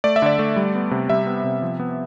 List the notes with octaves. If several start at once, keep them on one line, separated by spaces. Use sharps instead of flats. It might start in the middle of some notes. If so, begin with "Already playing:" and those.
A3 D5
E5
D3 D5
A3
G3
B3
C3
G3 E5
B3
C3
F3
B3